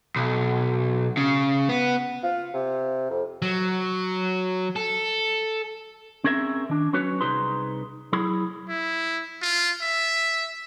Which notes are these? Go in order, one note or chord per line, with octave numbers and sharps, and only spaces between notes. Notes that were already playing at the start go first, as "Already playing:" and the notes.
B1
C#3
B3
F4
C3
F2
F#3
A4
C4 C#4 G#4 A#4 E5
D#3 D4
F#3 C#4 F#4 B4 C#5
C2 D#4 G#4 B4 C6
F#3 E4 G#4
E4
F4
E5